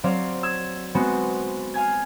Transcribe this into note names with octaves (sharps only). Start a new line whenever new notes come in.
F#3 C4 C5 D5 F5
E6 G#6
G#3 B3 C4 F#4
F5 G#5 G#6